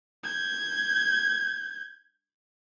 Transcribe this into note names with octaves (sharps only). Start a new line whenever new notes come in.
G6 G#6